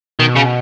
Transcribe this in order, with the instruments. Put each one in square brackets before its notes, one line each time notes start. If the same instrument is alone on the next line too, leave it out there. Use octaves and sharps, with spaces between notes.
[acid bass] B2 [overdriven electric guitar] D#3
[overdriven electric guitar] C#3